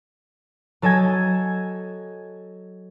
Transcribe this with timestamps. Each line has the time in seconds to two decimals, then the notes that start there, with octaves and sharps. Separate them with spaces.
0.82 F#3 A4 D#5 G#5 G#6